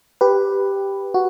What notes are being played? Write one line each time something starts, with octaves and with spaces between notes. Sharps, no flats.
G4 B4
F#4